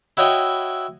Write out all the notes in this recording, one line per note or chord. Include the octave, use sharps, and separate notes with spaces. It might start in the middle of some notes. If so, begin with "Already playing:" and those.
E4 F#4 C#5 D#5 G5